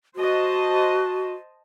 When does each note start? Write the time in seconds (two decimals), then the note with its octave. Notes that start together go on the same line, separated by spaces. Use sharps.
0.16 F#4 C5 D#5 A5